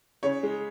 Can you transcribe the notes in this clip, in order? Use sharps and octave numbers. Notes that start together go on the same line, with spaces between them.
C#3 C#5
G#3